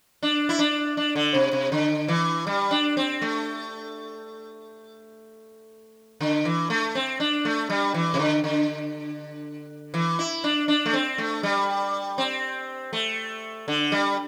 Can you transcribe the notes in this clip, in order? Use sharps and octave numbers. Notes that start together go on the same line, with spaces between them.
D4
E4
D4
D4
D3
C3
C3
D3
E3
G3
D4
C4
A3
D3
E3
A3
C4
D4
A3
G3
E3
C3
D3
D3
E3
E4
D4
D4
A3
C4
A3
G3
C4
A3
D3
G3